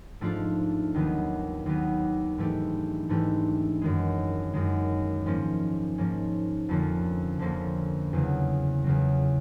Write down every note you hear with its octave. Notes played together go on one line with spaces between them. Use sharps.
G#2 F3 A3 D4 F4
D#2 D#3 F#3 B3
D#2 D#3 F#3 B3
G#2 E3 A3 D4 G4
G#2 E3 A3 D4 G4
F#2 D#3 G#3
F#2 D#3 G#3
G#2 F3 A#3 C#4
G#2 F3 A#3 C#4
F2 D3 F3 A#3 C#4
F2 D3 F3 A#3 C#4
E2 C#3 F#3
E2 C#3 F#3